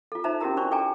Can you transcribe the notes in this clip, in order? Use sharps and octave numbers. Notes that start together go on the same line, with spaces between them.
F4 A4
D#4 C5 E5 A5 A#5
C#4 E4 F#4 G4 A#4 A#5
D4 C5 D5 C#6
A4 D5 G5 G#5 A#5